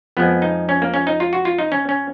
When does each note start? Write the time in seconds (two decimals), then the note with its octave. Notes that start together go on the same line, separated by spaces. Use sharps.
0.17 F2 F3 G#3 B3
0.42 D#4
0.69 C#4
0.82 A#3
0.94 C#4
1.07 D#4
1.20 F4
1.33 F#4
1.45 F4
1.59 D#4
1.72 C#4
1.89 C#4